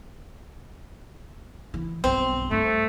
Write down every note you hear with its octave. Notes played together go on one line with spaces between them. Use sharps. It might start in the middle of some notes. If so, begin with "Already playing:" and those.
E3
B1 G2 C4
G2 A3